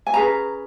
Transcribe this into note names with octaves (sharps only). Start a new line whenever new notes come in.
G#5
C#4 G#4 B4 A#5